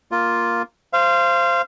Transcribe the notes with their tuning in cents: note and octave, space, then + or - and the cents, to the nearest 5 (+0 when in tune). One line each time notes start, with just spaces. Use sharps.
A#3 +0 F4 +0
C5 +0 F5 -25